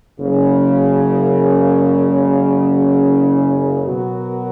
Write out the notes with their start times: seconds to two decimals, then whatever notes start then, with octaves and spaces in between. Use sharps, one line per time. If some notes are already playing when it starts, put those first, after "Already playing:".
0.19 F#1 F#2 C#3
3.83 B2 F#3 B3 F#4 A#4